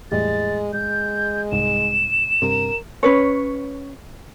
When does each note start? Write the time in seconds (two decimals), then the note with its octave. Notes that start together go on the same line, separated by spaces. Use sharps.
0.12 E2 A2 G3 G#3 A6
0.73 G#3 G6
1.52 C2 G#2 E7
2.42 G2 C3 A#4
3.03 C#4 B4 C#5